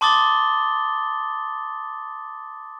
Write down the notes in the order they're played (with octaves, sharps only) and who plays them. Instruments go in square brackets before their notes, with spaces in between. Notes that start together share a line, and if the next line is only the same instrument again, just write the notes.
[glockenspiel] A5 C6 D6 D#6 A6 G7